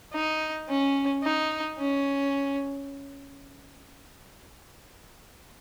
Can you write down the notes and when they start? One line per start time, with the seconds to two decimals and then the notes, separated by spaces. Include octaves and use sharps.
0.13 D#4
0.69 C#4
1.24 D#4
1.79 C#4